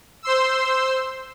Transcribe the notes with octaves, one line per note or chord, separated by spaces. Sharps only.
C5 C6 E6